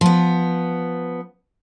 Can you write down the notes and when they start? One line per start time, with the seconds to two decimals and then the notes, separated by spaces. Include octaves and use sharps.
0.01 F3 B3